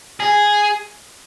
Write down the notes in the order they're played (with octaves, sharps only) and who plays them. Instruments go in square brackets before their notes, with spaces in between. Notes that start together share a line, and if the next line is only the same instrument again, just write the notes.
[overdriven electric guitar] G#4